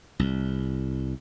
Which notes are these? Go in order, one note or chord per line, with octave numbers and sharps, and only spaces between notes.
C2